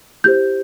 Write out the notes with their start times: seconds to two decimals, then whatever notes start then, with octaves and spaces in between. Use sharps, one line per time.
0.24 E4 G4 C5 G6